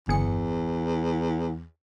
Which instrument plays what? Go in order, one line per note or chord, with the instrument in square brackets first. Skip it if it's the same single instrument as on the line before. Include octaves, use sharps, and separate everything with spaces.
[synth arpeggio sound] G1 G#4 C#7 [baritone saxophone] E2